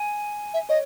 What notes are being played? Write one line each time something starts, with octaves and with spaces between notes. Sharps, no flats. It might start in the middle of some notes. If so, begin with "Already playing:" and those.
Already playing: G#5
E5
C#5 D#5